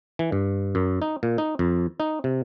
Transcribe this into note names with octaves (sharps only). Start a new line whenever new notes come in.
E3
G2
F#2
D#4
A#2
D#4
F2
D#4
C3